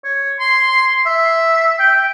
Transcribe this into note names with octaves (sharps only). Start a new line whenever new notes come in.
C#5
C6
E5
G5